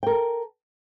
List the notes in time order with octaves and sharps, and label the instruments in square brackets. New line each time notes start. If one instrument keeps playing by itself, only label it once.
[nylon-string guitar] G5
A#4
A4